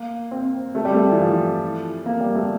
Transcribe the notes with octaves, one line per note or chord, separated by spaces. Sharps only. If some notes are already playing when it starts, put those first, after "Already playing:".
Already playing: A#3
C4
A3
G3
A3
E3
F3
A#3
G3
A3